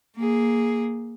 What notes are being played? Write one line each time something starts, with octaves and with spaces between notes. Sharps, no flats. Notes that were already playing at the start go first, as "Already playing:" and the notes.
A#3 G#4